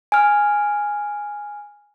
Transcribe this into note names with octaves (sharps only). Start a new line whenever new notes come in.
G#5 F6